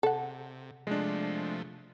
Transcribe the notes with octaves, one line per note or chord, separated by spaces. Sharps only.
C3 A4 F#5
C3 F3 G#3 A3 D4